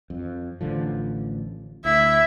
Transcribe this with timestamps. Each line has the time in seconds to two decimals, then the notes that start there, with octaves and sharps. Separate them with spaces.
0.10 F2
0.61 A1 D3 F3
1.85 D2 E4 E5